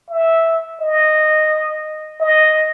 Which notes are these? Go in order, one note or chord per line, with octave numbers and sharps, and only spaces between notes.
E5
D#5
D#5